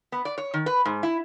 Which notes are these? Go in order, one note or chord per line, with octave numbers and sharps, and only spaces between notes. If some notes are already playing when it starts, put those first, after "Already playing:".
B3
D5
C#5
D#3
B4
G#2
E4